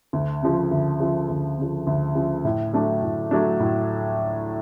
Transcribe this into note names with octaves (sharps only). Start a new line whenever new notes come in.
D2
C#3 F3
D2
C#3 F3
D2
C#3 F3
D2
C#3 F3
A2
F#3 A3 D4
A2
F#3 A3 D4
A2